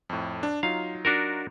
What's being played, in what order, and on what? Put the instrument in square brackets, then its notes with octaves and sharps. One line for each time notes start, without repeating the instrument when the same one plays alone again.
[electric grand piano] F2 A2
D4
[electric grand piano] F#3 D#4 F4 [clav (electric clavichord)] F5
[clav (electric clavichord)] D4 F#4 A#4